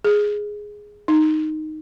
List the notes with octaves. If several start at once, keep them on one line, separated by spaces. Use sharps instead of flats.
G#4
D#4